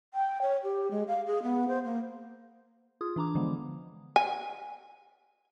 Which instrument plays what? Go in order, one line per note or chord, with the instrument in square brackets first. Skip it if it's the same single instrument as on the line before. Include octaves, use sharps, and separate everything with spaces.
[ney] G5
C#5
G4
G#3
F5
G#4
B3
C5
A#3
[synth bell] F4 G#4 D#6
E3 D4 A#5 D6
D3 F3 G#3 B3
[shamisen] G#5